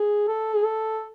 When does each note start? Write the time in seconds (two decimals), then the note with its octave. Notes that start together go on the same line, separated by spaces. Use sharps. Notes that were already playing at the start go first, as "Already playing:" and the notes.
Already playing: G#4
0.28 A4
0.55 G#4
0.64 A4